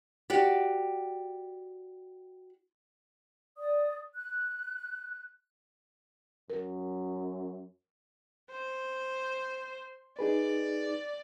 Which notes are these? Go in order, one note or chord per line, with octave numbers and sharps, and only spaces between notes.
F#4 G4 D5
D5 D#6
F#6
F#2 A#4
C5
D#4 G#4 B4 D5